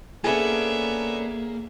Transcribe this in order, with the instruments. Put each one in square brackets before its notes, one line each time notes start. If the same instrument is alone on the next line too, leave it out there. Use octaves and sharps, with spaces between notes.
[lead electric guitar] A#3 [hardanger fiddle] B3 E5 [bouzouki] C#4 D4 A4 [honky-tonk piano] G#4